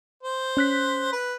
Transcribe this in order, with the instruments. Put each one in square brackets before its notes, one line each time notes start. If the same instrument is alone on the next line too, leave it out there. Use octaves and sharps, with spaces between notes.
[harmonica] C5
[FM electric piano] C#4 F#6 B6
[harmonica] B4